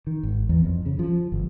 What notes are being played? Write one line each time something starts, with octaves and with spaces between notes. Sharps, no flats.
D#3
G#1
E2
F2
C#3
F3
G1